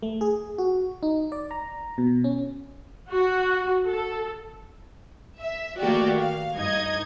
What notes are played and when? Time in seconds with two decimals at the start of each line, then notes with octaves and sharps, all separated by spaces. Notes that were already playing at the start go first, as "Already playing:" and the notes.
0.03 A3
0.21 G#4
0.58 F#4
1.03 D#4
1.32 D5
1.51 A#5
1.98 B2
2.24 C#4
3.10 F#4
3.86 A4
5.40 E5
5.79 D#3 A3 A#3 F#4 G4 D5
6.20 F5
6.57 G2 D#4 D#5 G#6